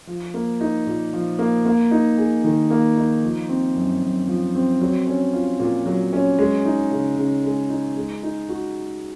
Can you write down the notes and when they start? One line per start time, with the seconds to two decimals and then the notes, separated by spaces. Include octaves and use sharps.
0.07 F3
0.34 A#3
0.61 D#4
0.87 A#2
1.13 F3
1.39 A#3
1.65 A#3
1.91 D#4
2.18 G#4
2.44 D#3
2.70 A#3
2.97 D#4
3.23 F3
3.49 C4
3.76 F#2
4.02 F#2
4.28 F3
4.55 C4
4.81 F#3
5.07 C#4
5.33 F4
5.60 A#2
5.86 F#3
6.13 C#4
6.39 G#3
6.65 D#4
6.91 C#3
7.17 C#3
7.44 G#3
7.70 D#4
7.96 G#3
8.23 D#4
8.49 F#4